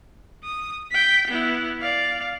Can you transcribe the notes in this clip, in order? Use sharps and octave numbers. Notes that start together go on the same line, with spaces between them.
D#6
G5 B6
B3 E4
D5 F5